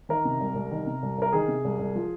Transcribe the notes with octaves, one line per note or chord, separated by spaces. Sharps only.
D#3 A#4
C3
C2
C2
D#3
C3
C2
C2 A#4
D#3 G#4
C3
C2
C2
F3